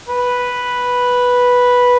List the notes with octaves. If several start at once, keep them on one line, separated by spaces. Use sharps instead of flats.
B4